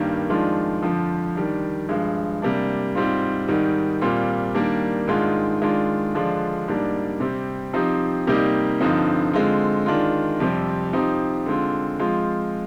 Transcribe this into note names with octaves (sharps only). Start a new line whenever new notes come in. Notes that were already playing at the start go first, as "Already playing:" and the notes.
Already playing: G2 D#3 G3 A#3
F2 D#3 G#3 D4 F4
F2 D3 F3
D#3 G3 D4
G2 F3 G#3
C3 G3 A#3 D4
G#2 G3 C4 F4
G#2 D#3 G3
A#2 G3 C4 F4
D#3 G3 A#3 D4
G#2 D#3 G#3 D4 F4
D#3 G#3 D4 F4
D3 F3 G#3 D4 F4
G#2 G3 A#3 D4
C3 G3 C4
F3 C4 D#4 G4
C3 G3 A#3 D#4 G4
G2 D3 F3 C4 D#4
D3 G#3 C4 F4
D#3 G#3 D4 F4
F2 C3 G3 C4
F3 C4 D#4 G4
D3 G#3 C4 F4
F3 G#3 C4 F4